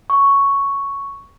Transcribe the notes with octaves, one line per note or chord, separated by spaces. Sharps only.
C#6